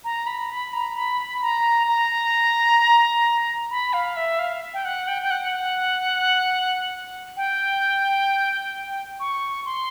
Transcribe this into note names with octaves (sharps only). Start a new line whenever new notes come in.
A#5
B5
B5
A#5
B5
A#5
A#5
B5
F5
E5
F5
G5
F#5
G5
G5
F#5
G5
C#6
C6